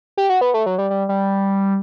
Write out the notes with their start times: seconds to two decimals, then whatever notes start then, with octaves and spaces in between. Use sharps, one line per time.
0.17 G4
0.30 F#4
0.41 B3
0.54 A3
0.66 F#3
0.78 G3
0.90 G3
1.09 G3